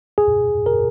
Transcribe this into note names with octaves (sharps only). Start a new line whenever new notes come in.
G#4
A#4